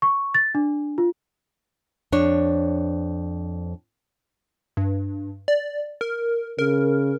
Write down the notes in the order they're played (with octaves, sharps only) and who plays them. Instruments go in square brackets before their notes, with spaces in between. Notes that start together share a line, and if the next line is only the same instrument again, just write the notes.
[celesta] C#6
A6
D4
F4
[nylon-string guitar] F2 D4 C#5
[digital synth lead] G2
D5
A#4
[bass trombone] C#3 [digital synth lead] A#4